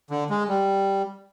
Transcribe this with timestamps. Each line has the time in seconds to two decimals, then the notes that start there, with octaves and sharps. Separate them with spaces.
0.11 D3
0.30 G#3
0.48 G3